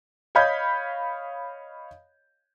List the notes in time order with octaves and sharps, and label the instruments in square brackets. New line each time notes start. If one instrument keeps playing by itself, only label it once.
[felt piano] C#5 D#5 F5 B5 G6 G#6